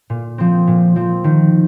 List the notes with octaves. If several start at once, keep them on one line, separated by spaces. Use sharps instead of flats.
A#2
F3 C4
A#2
F3 C4
D#3